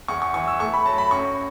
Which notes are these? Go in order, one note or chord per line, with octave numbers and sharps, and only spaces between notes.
E2 C#6
C#6
E3 C#6
E6
A3 C#6
B5
F#3 A5
B5
F#2 C#6